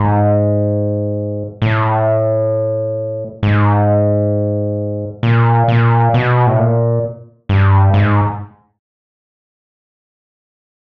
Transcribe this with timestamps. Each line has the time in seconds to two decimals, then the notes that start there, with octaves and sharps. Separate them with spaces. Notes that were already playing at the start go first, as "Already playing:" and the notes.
Already playing: G#2
1.62 A2
3.43 G#2
5.23 A#2
5.68 A#2
6.14 B2
6.47 A2
6.59 A#2
7.49 G2
7.94 G#2